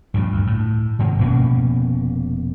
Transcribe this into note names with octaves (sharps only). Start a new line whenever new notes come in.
G2 A#2 F3
D2
A2
G#2 C3 D#3 G#3
F1 B2 A#3 C#4